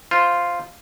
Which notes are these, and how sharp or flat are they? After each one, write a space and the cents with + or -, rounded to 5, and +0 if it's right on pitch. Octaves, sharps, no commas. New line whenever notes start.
F4 +0 C5 +0